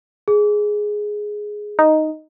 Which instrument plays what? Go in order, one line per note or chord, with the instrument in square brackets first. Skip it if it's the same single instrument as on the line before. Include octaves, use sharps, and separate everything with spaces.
[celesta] G#4
[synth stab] D#4